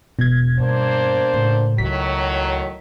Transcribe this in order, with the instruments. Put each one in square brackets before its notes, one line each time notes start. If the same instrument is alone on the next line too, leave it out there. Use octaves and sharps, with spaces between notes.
[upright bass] E1 E2 [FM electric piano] B2 G#6
[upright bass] G2 [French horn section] A#3 D4 C5
[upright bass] A2 C#3
[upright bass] C#2 [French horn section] A2 D#3 F#3 [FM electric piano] B6